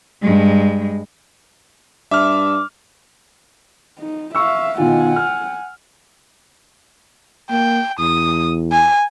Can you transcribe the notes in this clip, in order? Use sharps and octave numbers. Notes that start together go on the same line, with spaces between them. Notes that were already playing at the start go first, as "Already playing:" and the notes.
G2 G#3
G2 E5 D6 F6
D#4
E5 F5 C#6 E6
B2 D#3 F4 F#5 G#5
F6
A#3 G5
E2 D#6
G#5